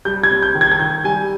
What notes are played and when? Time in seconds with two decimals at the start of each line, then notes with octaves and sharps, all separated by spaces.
0.05 G3 G6
0.24 G#6
0.30 C4
0.42 G6
0.55 D#3
0.61 G#6
0.72 G#6
0.79 D#3 G6
1.04 G3 G#5